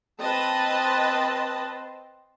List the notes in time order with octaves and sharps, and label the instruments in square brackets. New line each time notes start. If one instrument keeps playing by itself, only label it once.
[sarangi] C4 [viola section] B4 D#5 A5